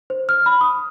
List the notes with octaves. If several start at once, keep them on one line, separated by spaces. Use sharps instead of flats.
C5
F6
B5
D#6